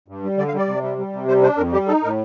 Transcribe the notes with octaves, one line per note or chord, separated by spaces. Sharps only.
G2
G3
D3 D5
F5
G3 D5
C3
G3
G3
C3
G3 C5
D4 C5
F2 A#4
G3 G4
D#4 A4
A2 A#4